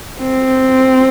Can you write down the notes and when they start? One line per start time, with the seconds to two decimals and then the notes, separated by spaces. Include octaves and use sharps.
0.20 C4